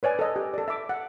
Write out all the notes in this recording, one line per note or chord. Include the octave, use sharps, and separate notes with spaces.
B4 C#5 D5 G#5
A4 D#5
G4
A4 D5
E5 D6
F#5